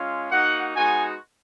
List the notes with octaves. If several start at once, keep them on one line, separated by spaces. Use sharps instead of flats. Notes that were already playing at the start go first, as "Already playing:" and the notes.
Already playing: G#3 C#4 F4
A#3 D#4 F#4 F#5
G#3 B3 D#4 F#4 G#5